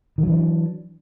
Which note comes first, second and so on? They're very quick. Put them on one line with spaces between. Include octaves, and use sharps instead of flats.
D#3 F#3 E3 D4